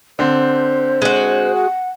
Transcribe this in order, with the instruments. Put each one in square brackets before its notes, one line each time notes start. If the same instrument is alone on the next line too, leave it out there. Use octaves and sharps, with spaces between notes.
[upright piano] D3 C4 [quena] C5
[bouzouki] G#3 F#4
[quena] F#5